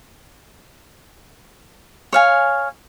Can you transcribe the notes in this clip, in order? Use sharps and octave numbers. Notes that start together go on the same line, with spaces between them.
C#5 F5 G#5